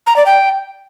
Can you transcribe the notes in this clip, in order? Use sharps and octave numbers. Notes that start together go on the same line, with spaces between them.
A#5
D5
G5